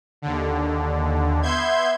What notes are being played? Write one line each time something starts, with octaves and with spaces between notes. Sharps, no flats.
D#2 D3
B3 E5 C6 G6 G#6